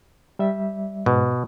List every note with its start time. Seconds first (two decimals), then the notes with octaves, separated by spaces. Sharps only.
0.39 G3 E5
1.06 G#2 B2